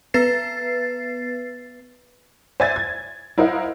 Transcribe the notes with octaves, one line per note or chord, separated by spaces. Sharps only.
B3 B4 A6 C7
C5 D5 E5 G#5 G#6 A6
G#6
E4 A#4 C5 D#5 F5 F#5